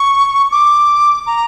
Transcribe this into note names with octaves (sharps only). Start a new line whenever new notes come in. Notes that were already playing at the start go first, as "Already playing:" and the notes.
Already playing: C#6
D6
A#5